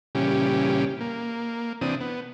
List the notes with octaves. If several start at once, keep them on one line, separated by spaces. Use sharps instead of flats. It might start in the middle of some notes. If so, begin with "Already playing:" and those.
A#2 C#3 E3 G3 C#4 G4
A#3
C3 E3 C4 D4 D#6
B3